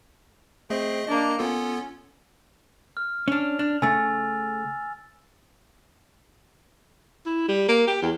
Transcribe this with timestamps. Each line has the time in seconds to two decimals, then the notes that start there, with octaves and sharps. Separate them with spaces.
0.70 A3 C4 G#4 D#5
1.08 A#3 D4 D#5 A#5
1.39 B3 C#4 F4 A4
2.97 F6
3.28 C#4 D4 F7
3.59 D4
3.82 C#3 A3 G#5 E6 A6
7.26 E4
7.48 G3
7.68 A#3
7.87 G4
8.02 E2